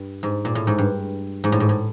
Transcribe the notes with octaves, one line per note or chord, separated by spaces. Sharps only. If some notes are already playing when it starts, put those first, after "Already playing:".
Already playing: G2
G#2
A#2
A2
G#2
G2
G#2
A2
G#2
A2